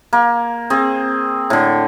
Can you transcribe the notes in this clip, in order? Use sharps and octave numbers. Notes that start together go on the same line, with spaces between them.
A#3
C4 G#4
A2 D3